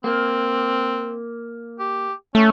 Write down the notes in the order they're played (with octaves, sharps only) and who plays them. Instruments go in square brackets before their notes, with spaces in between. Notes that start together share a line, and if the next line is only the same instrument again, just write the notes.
[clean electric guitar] A#3 [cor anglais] C4
[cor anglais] G4
[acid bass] A3 [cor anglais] C#4